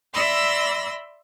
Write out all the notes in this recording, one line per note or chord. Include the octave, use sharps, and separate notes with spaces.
D5 E5 B5 C6 E6 A#6